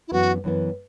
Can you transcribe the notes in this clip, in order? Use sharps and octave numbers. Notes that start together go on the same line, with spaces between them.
E4
F#2 E3 B3 F#4
F#2 E3 B3